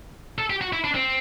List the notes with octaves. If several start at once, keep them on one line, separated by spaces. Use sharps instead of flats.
A4
G4
F#4
E4
D4
C4